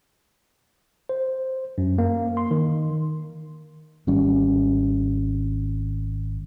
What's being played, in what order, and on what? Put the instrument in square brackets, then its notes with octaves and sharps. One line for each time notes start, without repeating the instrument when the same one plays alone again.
[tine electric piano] C5
F#2
A#3
C6
D#3
[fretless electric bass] G#1 G3 C#4